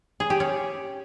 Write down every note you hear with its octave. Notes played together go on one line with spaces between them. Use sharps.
G#4
G4
C#4